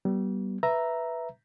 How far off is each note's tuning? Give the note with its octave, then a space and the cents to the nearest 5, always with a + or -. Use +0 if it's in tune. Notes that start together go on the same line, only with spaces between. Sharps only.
G3 -30 B3 -25
B4 +0 E5 +0 A#5 +0